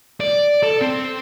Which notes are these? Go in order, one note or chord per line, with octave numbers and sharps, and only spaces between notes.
D5
A4
C4